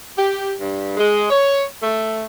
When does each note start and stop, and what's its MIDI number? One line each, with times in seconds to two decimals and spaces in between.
0.17 0.54 67
0.60 0.97 43
0.97 1.26 56
1.30 1.63 73
1.83 2.25 57